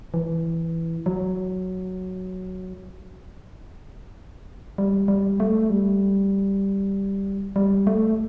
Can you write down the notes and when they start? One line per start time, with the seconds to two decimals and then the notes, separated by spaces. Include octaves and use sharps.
0.14 E3
1.06 F#3
4.78 G3
5.08 G3
5.40 A3
5.70 G3
7.56 G3
7.87 A3